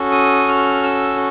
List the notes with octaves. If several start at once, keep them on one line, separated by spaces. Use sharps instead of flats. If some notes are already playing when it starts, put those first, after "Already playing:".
Already playing: C#4 F#4 A4
D#6
F6
E6